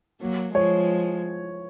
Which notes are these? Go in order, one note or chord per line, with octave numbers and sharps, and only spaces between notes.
F#3 A#3
F3 G#3 C#5